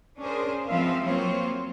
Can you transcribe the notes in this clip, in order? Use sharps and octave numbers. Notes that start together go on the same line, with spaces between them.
C#4 D4 G#4 A#4 C5
F3 G#3 B3 C4 E5 F5
F#3 A#3 C4 F4 C5 C#5